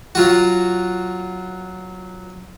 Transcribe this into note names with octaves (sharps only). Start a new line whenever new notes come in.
F#3 F4 F#4